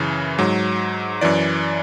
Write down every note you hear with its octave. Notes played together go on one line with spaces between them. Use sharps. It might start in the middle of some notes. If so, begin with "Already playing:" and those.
Already playing: F#2 C#3 E3
G#2 F#3
F#2 E3 D5